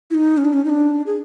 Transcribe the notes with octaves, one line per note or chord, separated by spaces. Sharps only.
E4
D#4
C#4
D4
C#4
D#4
D4
G#4